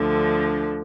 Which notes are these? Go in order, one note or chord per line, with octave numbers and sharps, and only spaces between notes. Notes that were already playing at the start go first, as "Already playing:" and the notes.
Already playing: D2 D3 F3